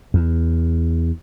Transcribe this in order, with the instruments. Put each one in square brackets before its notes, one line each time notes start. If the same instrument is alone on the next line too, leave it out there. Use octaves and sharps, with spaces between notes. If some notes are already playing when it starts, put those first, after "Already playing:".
[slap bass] E2